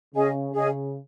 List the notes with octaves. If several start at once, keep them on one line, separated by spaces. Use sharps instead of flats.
C#3 C#4 G#4 D#5 G#5
C#3 C#4 G#4 D#5 G#5